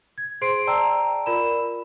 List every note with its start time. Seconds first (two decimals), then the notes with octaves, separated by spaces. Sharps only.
0.18 G#6
0.41 G#4 C5 C6 C7 D7
0.67 D5 G5 A5 A#5 E6
1.26 F4 A#4 D5 B5 E7